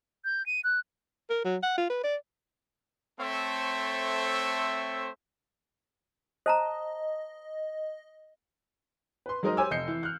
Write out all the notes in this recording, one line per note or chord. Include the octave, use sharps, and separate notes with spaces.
G6
D#7
F#6
A#4
F#3
F#5
F4
B4
D5
A3 C4 A4 C5 C#5 E5
C5 D#5 A5 A#5
B4 C6
F#3 G#3 D#4 A#4 C5 D#5
G4 C5 C#5 G#5 D6 E6
F1 D#5 G6 C7 C#7
E3
F6 F#6